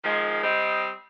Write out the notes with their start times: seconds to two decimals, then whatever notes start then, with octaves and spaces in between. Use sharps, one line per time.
0.04 D#3 F3 G#3
0.44 G3 C4 D#5